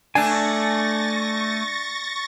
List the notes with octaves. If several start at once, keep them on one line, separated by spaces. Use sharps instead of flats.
A3 D4 G#5 C#6 A6 A#6